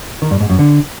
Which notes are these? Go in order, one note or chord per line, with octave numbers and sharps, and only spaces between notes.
D#3
G2
G#2
F#2
D3